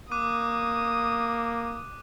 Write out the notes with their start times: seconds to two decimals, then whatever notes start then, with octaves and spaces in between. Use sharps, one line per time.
0.11 A#3 D6 D#6 F#6 D#7